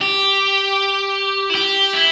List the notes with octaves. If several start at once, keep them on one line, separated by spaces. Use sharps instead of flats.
G4
E4
G4
E4